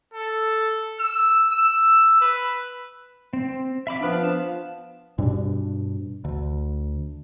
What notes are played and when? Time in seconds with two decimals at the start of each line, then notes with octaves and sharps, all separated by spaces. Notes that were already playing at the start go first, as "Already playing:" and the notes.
0.14 A4
1.00 E6
1.53 E6
2.21 B4
3.33 C4
3.87 E5 B5 D6
4.01 F3 B3 D4 B4 F5
4.24 A5
5.18 G2 B2 D4
6.25 D2